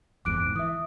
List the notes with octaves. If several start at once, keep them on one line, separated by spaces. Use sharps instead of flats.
F#1 E2 G#2 D6 F#6 D7
E3 E5 D#6